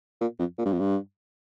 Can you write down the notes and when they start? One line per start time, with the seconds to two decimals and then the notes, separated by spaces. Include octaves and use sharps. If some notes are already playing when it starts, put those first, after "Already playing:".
0.21 A#2
0.39 F2
0.59 A#2
0.66 G2
0.72 F2
0.80 G2